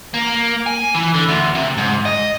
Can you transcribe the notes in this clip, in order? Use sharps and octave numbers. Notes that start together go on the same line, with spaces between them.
A#3
G#5
E3
D3
D2
C3
G#2
D#5